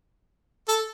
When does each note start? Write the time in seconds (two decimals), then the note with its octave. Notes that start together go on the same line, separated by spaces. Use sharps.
0.68 A4